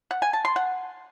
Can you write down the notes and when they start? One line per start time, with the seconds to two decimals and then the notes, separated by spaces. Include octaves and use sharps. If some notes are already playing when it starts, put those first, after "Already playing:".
0.11 F#5
0.22 G#5
0.33 A5
0.45 C6
0.56 F#5